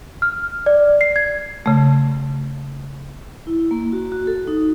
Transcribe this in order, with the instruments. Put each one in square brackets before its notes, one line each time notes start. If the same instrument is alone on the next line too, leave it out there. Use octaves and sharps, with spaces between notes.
[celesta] F6
D5
C7
G#6
[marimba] C#3 A3
[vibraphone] E4
A#3
F#4
F#4
A4
D#4